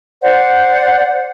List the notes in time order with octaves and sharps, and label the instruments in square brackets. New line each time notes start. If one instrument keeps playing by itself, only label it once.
[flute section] C5 D5 F#5